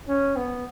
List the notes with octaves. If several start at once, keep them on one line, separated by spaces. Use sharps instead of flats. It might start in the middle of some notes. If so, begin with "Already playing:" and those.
C#4
B3